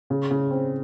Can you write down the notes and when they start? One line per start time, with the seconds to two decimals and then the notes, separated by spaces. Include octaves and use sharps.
0.10 C#3
0.31 C#3
0.51 C4